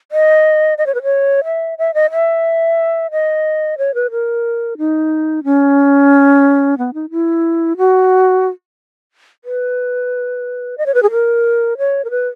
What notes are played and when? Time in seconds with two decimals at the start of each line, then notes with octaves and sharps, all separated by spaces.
0.12 D#5
0.78 D#5
0.86 C#5
0.95 B4
1.03 C#5
1.45 E5
1.78 E5
1.94 D#5
2.12 E5
3.11 D#5
3.78 C#5
3.94 B4
4.11 A#4
4.78 D#4
5.44 C#4
6.78 B3
6.94 D#4
7.11 E4
7.78 F#4
9.45 B4
10.78 D#5
10.86 C#5
10.94 B4
11.03 G#4
11.11 A#4
11.78 C#5
12.05 A#4
12.11 B4